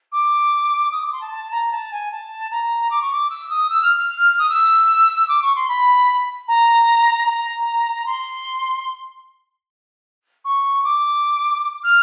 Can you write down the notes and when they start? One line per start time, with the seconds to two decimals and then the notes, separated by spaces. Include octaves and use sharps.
0.12 D6
0.92 D#6
1.02 D6
1.12 C6
1.21 A5
1.31 A5
1.51 A#5
1.72 A5
1.92 G#5
2.11 A5
2.51 A#5
2.91 D6
3.01 C#6
3.12 D6
3.30 E6
3.50 D#6
3.70 E6
3.82 F6
3.97 F6
4.39 D#6
4.49 E6
5.28 D6
5.42 C#6
5.56 C6
5.68 B5
6.48 A#5
7.26 A#5
8.06 C6
10.45 C#6
10.84 D6
11.84 F6